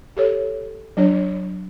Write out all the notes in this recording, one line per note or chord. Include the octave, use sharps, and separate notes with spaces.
G4 A4 C#5
F#3 D4 C#5